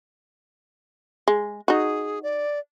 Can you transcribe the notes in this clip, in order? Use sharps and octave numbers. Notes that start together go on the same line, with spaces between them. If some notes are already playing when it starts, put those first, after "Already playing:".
G#3
D#4 F#4 G#4
D5